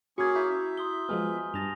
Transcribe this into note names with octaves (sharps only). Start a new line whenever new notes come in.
A#3 C#4 F#4 G#4 C#6 G#6
E4 A#5 G6 B6
E5
C6 D#6 G7
F3 G#3 B3 G#5 F6
G2 G#5 A5 A#6 F7